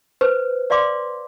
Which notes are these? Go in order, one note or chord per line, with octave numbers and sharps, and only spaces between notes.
B4 C5
B4 D5 F5 C6 D6